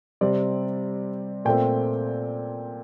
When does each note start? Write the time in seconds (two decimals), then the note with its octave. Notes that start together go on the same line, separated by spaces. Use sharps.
0.21 C3 G3 C4 D5
1.45 A#2 A3 C4 G5